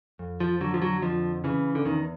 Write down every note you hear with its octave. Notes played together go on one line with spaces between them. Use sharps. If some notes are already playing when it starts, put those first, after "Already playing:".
F2
F3
D3 F#3
F3
F#3
F2 F3
C#3 E3
D3
E2 D#3